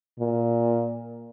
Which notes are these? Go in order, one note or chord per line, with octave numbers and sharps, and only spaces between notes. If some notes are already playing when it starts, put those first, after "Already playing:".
A#2